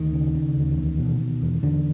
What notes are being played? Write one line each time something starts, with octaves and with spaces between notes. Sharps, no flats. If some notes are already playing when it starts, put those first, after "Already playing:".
Already playing: D2 D#3
C#3
C#3
D2
E2
B2
B2
E2
E2 D3